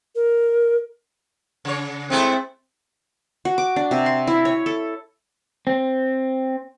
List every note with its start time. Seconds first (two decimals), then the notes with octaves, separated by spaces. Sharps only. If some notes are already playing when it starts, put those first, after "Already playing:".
0.15 A#4
1.65 C#3 C#5
2.10 G#3 A3 C4 E4
3.45 F#4
3.58 D6
3.76 D4
3.91 C3
4.06 C6
4.27 E4
4.45 C#5
4.66 A4
5.67 C4